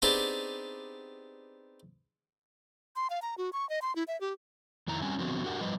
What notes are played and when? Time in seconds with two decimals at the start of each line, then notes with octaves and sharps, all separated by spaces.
0.02 B3 C4 D4 D#4 G4 G#4
2.96 C6
3.10 F5
3.22 A#5
3.38 F#4
3.53 C#6
3.69 D#5
3.82 C6
3.96 E4
4.08 E5
4.21 G4
4.88 F2 D#3 E4 A#5
5.02 G3 C4 C#4 G#5
5.19 D3 F3 B3 C4 F#4
5.44 D4 F#4 G4 A#4 F#5
5.61 F3 G3 B4 D#5